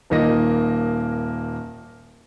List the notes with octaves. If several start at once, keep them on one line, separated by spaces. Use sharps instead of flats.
D#1 D#3 A#3 D#5 A#6